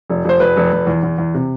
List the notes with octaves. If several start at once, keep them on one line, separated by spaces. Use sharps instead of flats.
F1
F1 C5
F1 B4
F1
F1
E2
E2
E2
C3